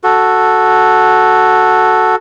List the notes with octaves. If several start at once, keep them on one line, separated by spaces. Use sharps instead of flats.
F#4 A4